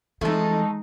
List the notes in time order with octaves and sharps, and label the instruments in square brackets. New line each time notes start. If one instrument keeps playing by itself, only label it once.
[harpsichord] F2 [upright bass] E3 [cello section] G#3 D#4 [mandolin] A3 A5